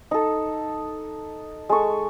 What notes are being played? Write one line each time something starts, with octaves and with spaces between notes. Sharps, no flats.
D#4 A4
G#3 A4 C#6